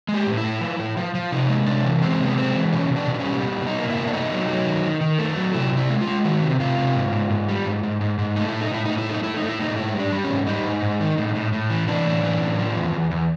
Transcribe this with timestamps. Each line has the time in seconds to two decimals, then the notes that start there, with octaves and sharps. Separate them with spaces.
0.08 G#3
0.14 G4
0.26 A2
0.37 E4
0.44 A2
0.61 F3
0.79 A2
0.97 F3
1.15 F3
1.32 C3 D#4
1.49 G#3
1.66 C3 D4
1.84 E3
2.02 G#3 C4
2.20 C3
2.26 B3
2.37 G#3 C4
2.55 E3
2.73 B2 C#4
2.90 B2
2.96 D4
3.07 B2
3.14 D4
3.19 C#4
3.25 G3
3.42 B2
3.60 B2
3.67 D#4
3.79 A#3
3.90 E4
3.96 B2
4.07 D4
4.13 A3 D#4
4.31 F#3
4.49 F#3
4.66 D#3
4.84 D#3
5.01 D#3
5.19 A3
5.36 F#3
5.54 C3 E4
5.72 C3
5.77 E4
5.89 G#3
6.01 F4
6.07 G#3
6.24 D#3 F#4
6.43 C3
6.60 C3 F4
6.78 C3
6.95 G#2
7.12 G#2
7.30 G#2
7.48 G3
7.66 G#2
7.83 G#2
8.01 G#2
8.19 G#2
8.36 A3 D#4
8.49 A2 E4
8.61 D#4
8.71 A2 E4
8.86 A2 D#4
8.98 E4
9.06 A3 D#4
9.24 A3 E4
9.37 D#4
9.42 A3
9.49 E4
9.60 A2 D#4
9.76 G#2 E4
9.94 G3
10.00 D4
10.12 G3
10.24 C#4
10.30 G#2
10.47 G3 D#4
10.65 G#2
10.82 G#2
11.00 D#3
11.18 A2
11.35 A2
11.53 A2
11.70 E3
11.88 E3 D4
12.05 A2
12.23 E3
12.40 A2
12.59 F3
12.76 E2
12.93 E2
13.11 E2